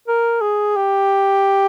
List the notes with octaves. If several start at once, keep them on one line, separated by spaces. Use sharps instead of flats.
A#4
G#4
G4